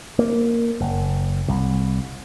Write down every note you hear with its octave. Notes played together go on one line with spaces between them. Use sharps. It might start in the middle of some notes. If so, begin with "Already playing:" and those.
A#3
F#1
C2